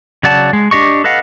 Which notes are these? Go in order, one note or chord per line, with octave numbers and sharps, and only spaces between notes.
C#3 F#3 D5 F#5 A5
G#3
D4 G4 D#5 C#6
A4 B4 D#5 F5 F#5